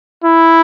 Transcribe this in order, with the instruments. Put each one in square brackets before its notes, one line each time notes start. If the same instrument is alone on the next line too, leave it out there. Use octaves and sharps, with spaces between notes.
[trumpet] E4